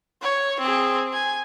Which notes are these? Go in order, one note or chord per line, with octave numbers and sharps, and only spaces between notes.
C#5
C4 G#4
G#5